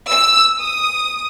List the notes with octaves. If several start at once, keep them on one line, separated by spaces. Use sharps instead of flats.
E6
D#6